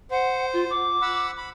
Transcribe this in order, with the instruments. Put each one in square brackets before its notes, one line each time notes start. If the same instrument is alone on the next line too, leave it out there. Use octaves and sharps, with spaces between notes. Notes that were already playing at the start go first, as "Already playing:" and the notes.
[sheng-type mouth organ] C5 [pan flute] F#5
[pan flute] F4
D6
[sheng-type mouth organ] F#5 B5 E6
B5